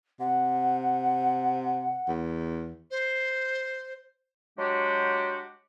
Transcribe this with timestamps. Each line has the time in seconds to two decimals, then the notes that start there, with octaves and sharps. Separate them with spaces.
0.20 C3 F#5
2.08 E2
2.91 C5
4.59 F#3 G#3 D4 F#4 G4